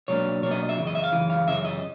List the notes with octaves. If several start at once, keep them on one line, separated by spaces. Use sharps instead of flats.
B2 F#3 A#3 D4 C#5
B2 F#3 A#3 D4 C#5
D#5
E5
F#2 C#3 E3
D#5
E5
F5
F#2 C#3 E3
F5
F#2 C#3 E3 E5
D#5